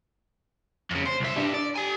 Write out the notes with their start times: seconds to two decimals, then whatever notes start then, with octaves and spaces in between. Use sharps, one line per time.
0.91 F2 C#3
1.05 C5
1.20 C2 E5
1.36 G3 D4
1.54 D5
1.76 G4 G#5